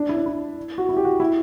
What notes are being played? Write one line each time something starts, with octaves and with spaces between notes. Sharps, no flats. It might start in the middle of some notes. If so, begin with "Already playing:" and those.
Already playing: D4
E4
D4
E4
F#4
E4
G4
F#4
E4